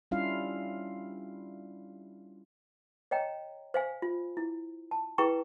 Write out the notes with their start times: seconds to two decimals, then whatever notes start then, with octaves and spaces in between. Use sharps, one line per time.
0.11 G3 C#4 D4 E4 F4 F5
3.11 C#5 D#5 G5 A#5
3.74 C5 F5 G#5
4.02 F4
4.37 E4
4.91 A5
5.18 E4 G#4 B4 G5 A#5 C#6